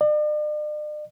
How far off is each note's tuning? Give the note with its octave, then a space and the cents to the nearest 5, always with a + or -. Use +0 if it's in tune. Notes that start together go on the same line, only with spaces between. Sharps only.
D5 +45